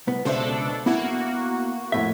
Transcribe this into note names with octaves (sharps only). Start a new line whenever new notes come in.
C2 B3
C#2 B2 D4 A4 C5 E5
A#3 B3 E4 F#4 F#5
F2 A2 E5